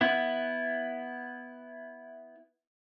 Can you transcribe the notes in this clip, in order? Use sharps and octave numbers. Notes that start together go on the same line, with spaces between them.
B3 E4